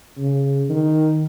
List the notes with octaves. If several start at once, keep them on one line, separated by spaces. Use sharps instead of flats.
C#3
D#3